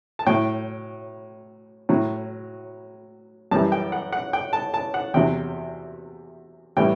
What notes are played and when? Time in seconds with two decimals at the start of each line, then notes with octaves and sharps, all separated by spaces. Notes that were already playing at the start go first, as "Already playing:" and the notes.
0.19 A5
0.27 A2 F#3 G5
1.89 A2 F#3
3.51 F#2 E3 G3 A5
3.72 G5
3.92 F#5
4.13 F#5
4.33 G5
4.53 A5
4.74 A5
4.94 F#5
5.14 E2 C3 F#3 G5
6.77 A2 E3 G3 G5